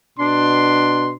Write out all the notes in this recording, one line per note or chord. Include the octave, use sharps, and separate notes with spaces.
B2 D4 C6